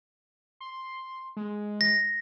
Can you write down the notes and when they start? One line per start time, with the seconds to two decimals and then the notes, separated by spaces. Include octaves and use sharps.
0.61 C6
1.37 G#3
1.81 A#6